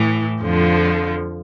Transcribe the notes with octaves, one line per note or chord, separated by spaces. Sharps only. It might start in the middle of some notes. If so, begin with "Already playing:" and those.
Already playing: A2 E3
F2 D3 F3